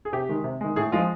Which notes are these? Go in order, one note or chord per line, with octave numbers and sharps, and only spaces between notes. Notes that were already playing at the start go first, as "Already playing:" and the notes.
G#4
C3 G4
D#3 G#3
C3
D#3 G#3
A2 G#4
F3 G#3 F4